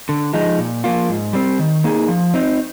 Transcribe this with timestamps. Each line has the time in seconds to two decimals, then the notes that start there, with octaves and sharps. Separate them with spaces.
0.09 D3
0.34 F3 G#3 D#4
0.58 A#2
0.84 F3 A#3 F4
1.09 G#2
1.33 G3 C4
1.59 D#3
1.84 A#3 D#4 G#4
2.08 F3
2.34 C4 D#4